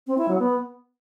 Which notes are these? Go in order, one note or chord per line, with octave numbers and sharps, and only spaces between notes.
C4
E4
F#3
B3